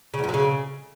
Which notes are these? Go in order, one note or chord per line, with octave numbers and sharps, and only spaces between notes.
C#3
E2
F#2
F#3
C#3